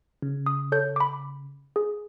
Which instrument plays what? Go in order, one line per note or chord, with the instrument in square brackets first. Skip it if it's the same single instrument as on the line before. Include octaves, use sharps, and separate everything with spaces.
[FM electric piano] C#3
[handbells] D#6
A4 C#5 G6
B5 D6
G#4